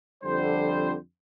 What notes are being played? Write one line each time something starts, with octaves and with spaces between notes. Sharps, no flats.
F2 D3 G3 C5